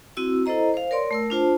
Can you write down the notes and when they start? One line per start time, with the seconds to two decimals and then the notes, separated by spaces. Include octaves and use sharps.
0.17 C4 E4 F#4 E6
0.46 E4 A4 C5 D#5 A#5
0.74 C5 F5
0.91 A#4 C#5 D5 C6
1.11 A3 A#4 E6
1.30 D4 F4 C5 A5